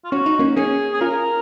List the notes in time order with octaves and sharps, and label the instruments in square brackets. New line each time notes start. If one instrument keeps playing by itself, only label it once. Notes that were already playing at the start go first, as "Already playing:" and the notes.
[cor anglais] F4
[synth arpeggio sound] C#4 [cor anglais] F#4
[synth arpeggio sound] D#4
A#3 C#4
[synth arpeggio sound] A#3 C#4 [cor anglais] G#4
[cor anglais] G#4
[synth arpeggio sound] C#4 F4 [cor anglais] A#4